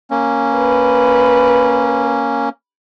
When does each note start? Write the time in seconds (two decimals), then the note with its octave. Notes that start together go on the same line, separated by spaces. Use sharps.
0.11 A#3 C#4
0.55 B4